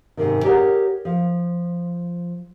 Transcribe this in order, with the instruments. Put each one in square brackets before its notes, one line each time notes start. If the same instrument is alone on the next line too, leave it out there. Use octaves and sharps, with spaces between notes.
[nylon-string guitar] G#2 C3 D#3
G4 G#4 A#4 C#5 F5 F#5
F3